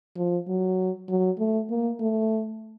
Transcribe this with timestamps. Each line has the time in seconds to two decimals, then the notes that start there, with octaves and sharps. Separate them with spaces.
0.17 F3
0.48 F#3
1.09 F#3
1.39 A3
1.70 A#3
2.00 A3